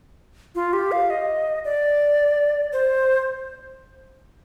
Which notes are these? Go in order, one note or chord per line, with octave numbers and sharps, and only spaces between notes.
F4
G4
F5
D#5
D5
C5